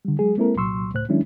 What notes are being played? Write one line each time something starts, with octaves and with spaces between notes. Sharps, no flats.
D3 G3
F#3 G#3 G#4
G#3 A#3 C4 E4 A4 A#4
C2 A#2 F#3 C6 C#6 E6
C#2 A2 C5 F#6
D#3 F#3 G#3 C#4 D4 E4